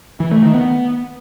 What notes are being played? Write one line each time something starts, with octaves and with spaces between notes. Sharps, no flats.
E3
A3
D#3
B3